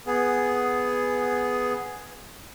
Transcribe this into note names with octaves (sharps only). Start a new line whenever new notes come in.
B3 G#4